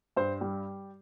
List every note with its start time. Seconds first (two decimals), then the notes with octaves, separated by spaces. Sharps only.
0.16 G2 C5
0.41 G3